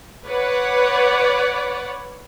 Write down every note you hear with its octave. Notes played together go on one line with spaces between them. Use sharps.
B4 C#5 D5 F#5